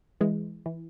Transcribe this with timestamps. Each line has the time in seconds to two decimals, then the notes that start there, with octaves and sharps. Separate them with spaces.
0.21 E3 G#3
0.66 E3